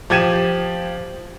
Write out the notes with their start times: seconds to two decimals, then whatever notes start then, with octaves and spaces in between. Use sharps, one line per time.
0.10 F3 G4 G#6 D#7 E7